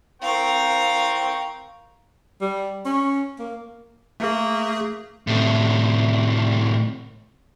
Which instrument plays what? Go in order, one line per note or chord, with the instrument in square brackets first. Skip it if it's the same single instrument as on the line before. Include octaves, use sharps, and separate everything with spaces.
[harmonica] C4 G5 C#6 [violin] A#4 F5
[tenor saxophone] G3
C#4
A#3
[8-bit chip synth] A3 G#4 [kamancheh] A#3
[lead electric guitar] A2 C3